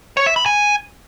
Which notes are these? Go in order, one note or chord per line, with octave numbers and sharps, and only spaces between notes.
C#5
E5
B5
G#5